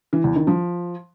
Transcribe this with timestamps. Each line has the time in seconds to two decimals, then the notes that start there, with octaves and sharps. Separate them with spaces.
0.13 E3
0.24 E2
0.36 D#3
0.47 F3